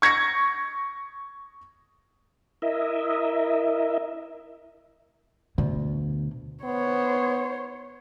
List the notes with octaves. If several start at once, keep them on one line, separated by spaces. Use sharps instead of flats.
C#6 G#6 A#6 C#7
E4 A#4 D#5 E5
D2 B2
B3 C5 C#5